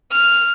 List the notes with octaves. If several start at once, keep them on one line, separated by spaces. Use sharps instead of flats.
F6